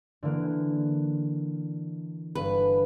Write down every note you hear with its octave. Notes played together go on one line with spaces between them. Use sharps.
D3 E3 A#3
G1 B4